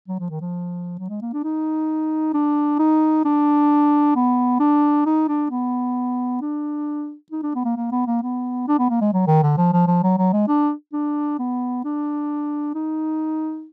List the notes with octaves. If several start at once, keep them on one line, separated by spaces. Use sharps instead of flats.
F#3
F3
D#3
F3
F#3
G#3
A#3
D4
D#4
D4
D#4
D4
B3
D4
D#4
D4
B3
D4
D#4
D4
B3
A#3
A#3
B3
A#3
B3
D4
B3
A#3
G#3
F#3
D#3
D3
F3
F3
F3
F#3
F#3
G#3
D4
D4
B3
D4
D#4